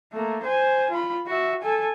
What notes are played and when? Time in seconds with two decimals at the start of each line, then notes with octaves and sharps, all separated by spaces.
0.13 A3 A#3
0.43 C5 G#5
0.91 F4 B5
1.27 F#4 E5
1.62 A4 G#5